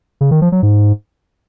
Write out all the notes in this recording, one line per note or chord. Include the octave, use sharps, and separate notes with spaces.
C#3
D#3
F3
F#3
G#2